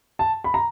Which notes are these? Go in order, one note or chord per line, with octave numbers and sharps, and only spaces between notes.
A5
B5
A#5